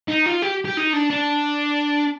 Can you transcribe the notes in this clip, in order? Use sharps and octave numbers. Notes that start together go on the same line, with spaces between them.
D#4
F4
G4
G4
D#4
D4
D4